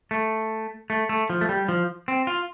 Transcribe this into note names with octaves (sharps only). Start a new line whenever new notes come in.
A3
A3
A3
F3
A3
G3
F3
C4
F4